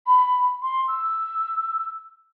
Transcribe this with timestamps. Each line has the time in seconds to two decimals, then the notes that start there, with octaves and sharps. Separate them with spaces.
0.06 B5
0.62 C6
0.88 E6